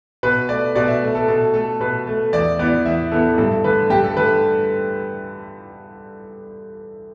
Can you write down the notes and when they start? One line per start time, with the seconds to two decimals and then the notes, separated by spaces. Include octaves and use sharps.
0.23 B2 B4
0.49 A3 D5
0.75 B2 D5
0.88 E5
1.02 A3
1.15 A4
1.28 B2 A4
1.54 A3 A4
1.80 B2 B4
2.07 A3
2.33 E2 D5
2.59 E3 B3 D5
2.85 E2 E5
3.11 E3 B3 A4
3.38 G2 A4
3.64 D3 A3 B4
3.90 G2 G4
4.04 A4
4.17 D3 A3 B4